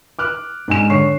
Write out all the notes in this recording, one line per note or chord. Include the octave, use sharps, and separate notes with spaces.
D6 F6 F#6
G#2 D4 G#5 E7
D3 C#5 C#6 C7